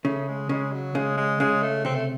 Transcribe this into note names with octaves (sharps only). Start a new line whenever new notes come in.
C#3 A3
G#3
C#3 G#3
F#3
C#3 G#3
G#3
C#3 G#3
A3
C3 C4
A3